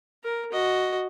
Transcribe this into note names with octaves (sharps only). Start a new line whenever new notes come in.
A#4
F#4 D#5